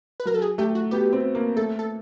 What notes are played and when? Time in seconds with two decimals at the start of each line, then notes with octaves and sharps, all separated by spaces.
0.20 B4
0.25 F#3 A#4
0.34 A4
0.42 G#4
0.58 A3 G4
0.75 F#4
0.91 B3 G4
1.13 C4
1.35 A#3
1.56 A3 A4
1.79 A4